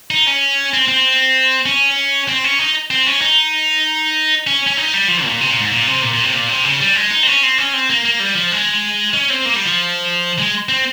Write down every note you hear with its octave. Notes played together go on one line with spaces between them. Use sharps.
D#4
C#4
C4
C4
C#4
C4
C#4
D#4
C4
C#4
D#4
C#4
C#4
D#4
G3
F3
A#2
C3
A#2
G#2
A#2
C3
A#2
A#2
C3
A#2
C3
C#3
G3
G#3
D#4
C4
C#4
C4
C#4
C4
A#3
A#3
G3
F3
G#3
C#4
C4
A#3
G3
F3
G#3
C4